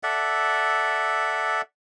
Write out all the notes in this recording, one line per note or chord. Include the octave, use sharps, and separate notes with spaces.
A4 D5 E5 F#5